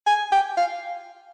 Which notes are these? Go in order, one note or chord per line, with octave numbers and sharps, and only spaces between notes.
G#5
G5
F5